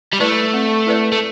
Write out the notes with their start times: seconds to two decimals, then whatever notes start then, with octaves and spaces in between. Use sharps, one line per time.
0.13 G3
0.20 A3 E4 B4 D5
0.53 C4
0.86 E4 B4 D5
1.12 A3